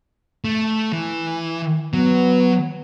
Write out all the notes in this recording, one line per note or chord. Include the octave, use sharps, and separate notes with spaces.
A3
E3
F#3 B3